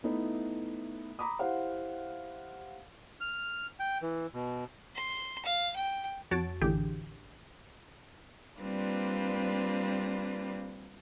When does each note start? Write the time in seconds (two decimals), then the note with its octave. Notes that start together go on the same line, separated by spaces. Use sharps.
0.03 A3 B3 D#4 E4
1.19 A#5 B5 D6 D#6
1.39 E4 G4 C5 F5 F#5
3.21 F6
3.80 G5
4.02 E3
4.34 B2
4.96 C6
5.46 F5
5.76 G5
6.31 F2 F#4 C#5 A5 A6 D7
6.61 A1 D3 E3 G4 G#4 G5
8.58 G3 A#3 C4 D4 F4 B4